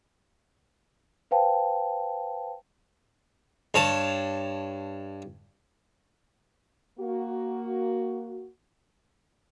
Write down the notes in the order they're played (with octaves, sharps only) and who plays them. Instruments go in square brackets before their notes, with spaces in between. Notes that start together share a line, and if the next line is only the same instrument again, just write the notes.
[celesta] B4 C5 F5 G5 A5
[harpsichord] G2 C#5 A5
[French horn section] A#3 F#4